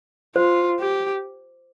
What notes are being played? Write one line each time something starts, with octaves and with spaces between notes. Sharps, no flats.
F4 C5
G4